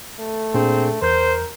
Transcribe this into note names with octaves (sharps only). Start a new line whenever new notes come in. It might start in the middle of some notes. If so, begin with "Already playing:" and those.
A3
A#2 C4 D4 G#4
E2 A#4 C5 G6